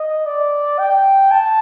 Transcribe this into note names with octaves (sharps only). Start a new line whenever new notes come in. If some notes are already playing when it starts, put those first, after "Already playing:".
Already playing: D#5
D5
G5
A5